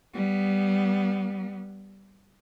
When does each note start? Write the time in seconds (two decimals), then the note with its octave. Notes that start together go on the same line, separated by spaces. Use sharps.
0.14 G3 B3